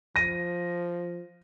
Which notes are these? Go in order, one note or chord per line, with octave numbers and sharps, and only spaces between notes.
F3 A#6 D#7